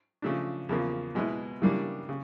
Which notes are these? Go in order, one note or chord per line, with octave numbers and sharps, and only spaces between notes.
C#3 F3 A3 D4
E2 C#3 F3 A#3
B2 G#3 B3 E4
C#3 E3 G3 A#3 D4
C#3